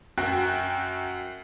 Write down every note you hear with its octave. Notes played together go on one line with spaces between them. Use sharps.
F#2 F#4 G5 F#6